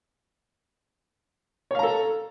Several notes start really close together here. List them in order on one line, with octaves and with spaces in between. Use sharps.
C#5 F5 A#5 A4